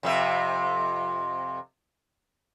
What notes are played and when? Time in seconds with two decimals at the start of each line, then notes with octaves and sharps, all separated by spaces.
0.03 F2 C3 E5